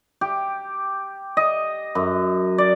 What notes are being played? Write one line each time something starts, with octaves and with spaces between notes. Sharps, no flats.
G4
D#5
F#2
D5